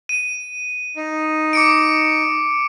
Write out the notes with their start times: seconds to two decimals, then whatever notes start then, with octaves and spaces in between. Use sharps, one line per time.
0.09 D#7
0.96 D#4
1.53 D6 C#7 D7